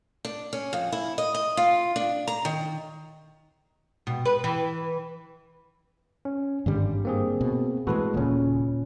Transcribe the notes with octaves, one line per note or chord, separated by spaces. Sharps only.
D4
C#4
F2
E4
D#5
D#5
F4
D4
A#5
D#3
B2
B4
E3
C#4
G#1 G2 D3 G3
A#3 C4 G#4
B2
A2 E3 G#3 F#4 A4 B4
D#1 A#2 C#3 C#4